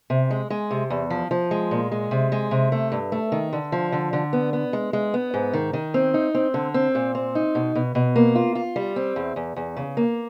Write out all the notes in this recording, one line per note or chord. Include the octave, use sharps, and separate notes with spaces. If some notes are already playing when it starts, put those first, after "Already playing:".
C3
G#3
G#3
C3
E2
F3
F3
G#3
A#2
G#3
C3
G#3
C3
A3
G2
A3
D#3
D3
F3
D3
D3
B3
B3
G#3
G#3
B3
G#2
D#3
D#3
C4
D#4
C4
D3
C4
A#2
C4
D#4
B2
B2
B2
A#3
F4
F4
G3
C4
E2
E2
E2
C#3
A#3